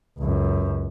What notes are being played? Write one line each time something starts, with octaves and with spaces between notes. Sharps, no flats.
C#2 F#2